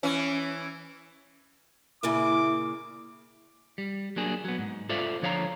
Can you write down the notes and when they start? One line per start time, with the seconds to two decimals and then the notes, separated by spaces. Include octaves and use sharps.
0.03 E3 C#4
2.03 A#2 C#3 A#3 E4 D6
3.78 G3
4.16 F#3 A#3 D4 G#4
4.45 F#3 B3
4.58 G#2
4.89 F4 A4 C5 D5 E5 F5
5.22 D3 F3 C#5 F5 F#5 A#5